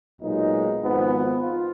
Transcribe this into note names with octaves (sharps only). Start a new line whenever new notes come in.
B1 A#2 G#3 D#4
G#1 G#2 F3 B3
F4